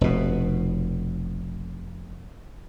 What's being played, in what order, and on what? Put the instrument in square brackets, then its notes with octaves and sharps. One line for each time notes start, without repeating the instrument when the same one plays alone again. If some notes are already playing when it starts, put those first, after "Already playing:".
[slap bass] F1 B2